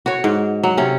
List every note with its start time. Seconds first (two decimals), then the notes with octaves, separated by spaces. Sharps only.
0.06 F#4 C#5
0.24 G#2
0.63 F#3
0.77 C3 C#4